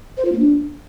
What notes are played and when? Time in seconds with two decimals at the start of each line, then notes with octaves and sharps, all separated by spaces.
0.17 C5
0.25 F4
0.32 A#3
0.40 D4